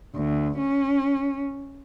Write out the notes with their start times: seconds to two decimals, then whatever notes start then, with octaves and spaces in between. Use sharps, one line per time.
0.15 D2
0.59 C#4